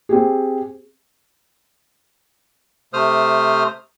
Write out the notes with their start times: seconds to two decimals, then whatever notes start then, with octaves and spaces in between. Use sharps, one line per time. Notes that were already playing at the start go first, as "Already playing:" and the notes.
0.09 C4 G4 G#4
2.93 C3 A3 C5 D#6 F6